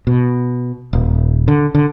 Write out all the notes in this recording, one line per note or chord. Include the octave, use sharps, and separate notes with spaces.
B2
D#1
D3
D3